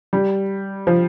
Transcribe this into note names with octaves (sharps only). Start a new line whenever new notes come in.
G3
F3